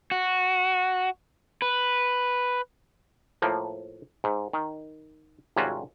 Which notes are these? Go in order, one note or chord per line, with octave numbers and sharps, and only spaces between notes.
F#4
B4
A2 F3 A#3
G#2
D#3
G#1 C3 G3 C#4 F4 F#4